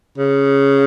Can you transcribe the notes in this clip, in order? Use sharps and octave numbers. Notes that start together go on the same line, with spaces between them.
C#3